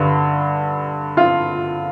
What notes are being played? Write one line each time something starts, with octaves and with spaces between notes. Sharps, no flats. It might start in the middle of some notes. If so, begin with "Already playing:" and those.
Already playing: G2 D3
F4